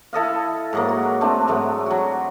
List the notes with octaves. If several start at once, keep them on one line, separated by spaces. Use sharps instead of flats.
E4 A4 D#5 F5
G#2 F#3 A#3
F#4
A3 C4 D4
G#2 F#3 A3
F#3 F#4